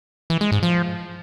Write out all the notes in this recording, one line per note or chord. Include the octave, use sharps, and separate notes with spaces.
E3
G#3
G#2
F3